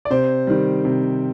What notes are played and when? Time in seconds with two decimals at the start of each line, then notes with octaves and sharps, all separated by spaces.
0.05 D5
0.10 C3 C5
0.47 D#3 G3
0.85 C3